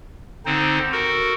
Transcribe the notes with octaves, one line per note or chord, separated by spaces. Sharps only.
D3 C4 D#4 C5
F#4 A4 A#4